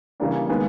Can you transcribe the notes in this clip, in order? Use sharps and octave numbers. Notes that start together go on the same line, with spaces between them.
C#3 E3 G3 A#3 D4
D#3 G#3 B3